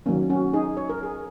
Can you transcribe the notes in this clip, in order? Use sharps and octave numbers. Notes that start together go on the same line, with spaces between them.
D#3 F#3 A#3 C#4
C#4 F#4
D#4 G#4
C#5
A#4
G#4